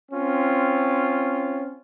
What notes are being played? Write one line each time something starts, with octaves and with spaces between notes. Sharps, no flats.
C4 C#4 F4